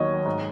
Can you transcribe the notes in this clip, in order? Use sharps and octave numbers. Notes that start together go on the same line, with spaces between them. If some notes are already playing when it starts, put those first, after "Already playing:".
Already playing: D#2 D#3 F#3 C#5 D#5
G#2